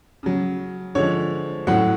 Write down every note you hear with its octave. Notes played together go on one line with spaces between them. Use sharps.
C#3 F#3
D3 F3 G#3 C#5
A2 F#3 F#5